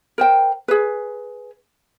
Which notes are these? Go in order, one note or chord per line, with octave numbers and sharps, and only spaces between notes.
A#4 C5 G5
G#4 B4